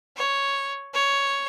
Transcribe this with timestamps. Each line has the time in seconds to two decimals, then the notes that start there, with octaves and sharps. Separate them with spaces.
0.17 C#5
0.94 C#5